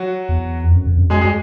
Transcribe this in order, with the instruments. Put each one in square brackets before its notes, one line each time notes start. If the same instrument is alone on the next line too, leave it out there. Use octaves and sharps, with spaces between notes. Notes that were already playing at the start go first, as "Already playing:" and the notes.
Already playing: [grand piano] F#3 F#4
[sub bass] E2
F2
F#2
F2
F#2
[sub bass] F#2 [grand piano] G#3 G#4
[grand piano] G#3 G#4